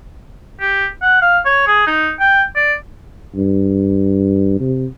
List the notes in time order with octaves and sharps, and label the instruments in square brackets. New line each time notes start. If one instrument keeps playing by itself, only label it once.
[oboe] G4
F#5
F5
C#5
G#4
D#4
G5
D5
[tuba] G2
C3